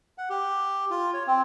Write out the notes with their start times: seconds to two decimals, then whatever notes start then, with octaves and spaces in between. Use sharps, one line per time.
0.18 F#5
0.30 G4
0.90 F4
1.14 C#5
1.27 C4